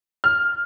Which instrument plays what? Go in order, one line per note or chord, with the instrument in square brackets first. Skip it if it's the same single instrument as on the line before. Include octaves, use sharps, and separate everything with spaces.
[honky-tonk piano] F6